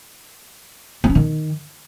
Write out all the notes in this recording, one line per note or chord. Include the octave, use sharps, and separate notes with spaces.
A#3
C#4
D#3